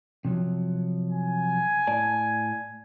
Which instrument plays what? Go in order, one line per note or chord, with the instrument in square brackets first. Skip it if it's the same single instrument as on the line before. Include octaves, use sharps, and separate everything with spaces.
[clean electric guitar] C3 F3 F#3
[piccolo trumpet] G#5
[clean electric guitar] A2 D5 A5